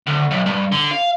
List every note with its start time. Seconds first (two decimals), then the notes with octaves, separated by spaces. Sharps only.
0.07 D2
0.31 B1
0.46 G2
0.72 D3
0.91 F5